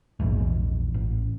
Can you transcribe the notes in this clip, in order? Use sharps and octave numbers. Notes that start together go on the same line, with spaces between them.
A#1 E2 G#2
A1